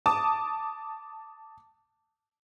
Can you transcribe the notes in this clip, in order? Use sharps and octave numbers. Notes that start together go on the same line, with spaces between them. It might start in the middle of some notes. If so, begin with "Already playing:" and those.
A5 D6 D#6